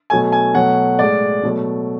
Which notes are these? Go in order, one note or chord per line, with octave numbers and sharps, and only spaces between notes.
B2 F#3 A3 G#5
G#5
B2 F#3 A3 F#5
A2 G#3 D5
B2 F#3 A3